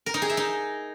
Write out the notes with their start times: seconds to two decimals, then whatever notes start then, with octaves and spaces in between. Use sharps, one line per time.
0.06 A#4
0.14 D#4
0.22 G#4
0.30 E5
0.37 D#4